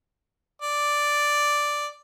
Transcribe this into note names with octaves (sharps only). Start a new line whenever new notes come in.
D5